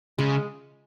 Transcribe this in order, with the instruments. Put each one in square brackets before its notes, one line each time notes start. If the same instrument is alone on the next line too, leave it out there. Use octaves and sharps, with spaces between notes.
[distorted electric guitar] C#3 [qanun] G#3